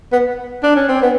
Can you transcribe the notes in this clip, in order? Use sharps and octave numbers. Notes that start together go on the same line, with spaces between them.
B3
D4
C#4
C4
B3